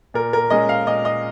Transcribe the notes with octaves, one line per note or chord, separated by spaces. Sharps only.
A#2 A#4
A#4
G#3 C#4 D#5
F5
A#2 D#5
D#5